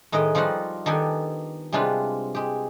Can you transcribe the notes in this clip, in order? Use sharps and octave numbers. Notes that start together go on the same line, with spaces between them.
A2 D#3 G#3 B4 D#5
F3 G3 D#4 F4 F#4 F#5
D#3 B3 D4 G4 A4 G#5
C3 G3 G#3 D4 F4 B4
G#3 G4